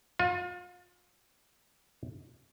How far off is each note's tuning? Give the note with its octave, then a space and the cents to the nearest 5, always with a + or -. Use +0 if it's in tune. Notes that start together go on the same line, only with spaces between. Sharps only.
F4 +35